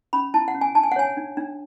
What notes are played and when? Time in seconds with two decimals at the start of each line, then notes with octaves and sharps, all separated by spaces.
0.13 C#4 B5
0.34 E4 A5
0.48 F#5
0.54 C#4
0.61 G#5
0.75 D4 A5
0.83 G#5
0.92 F#5
0.96 C#5 G#5
1.17 D4
1.37 D4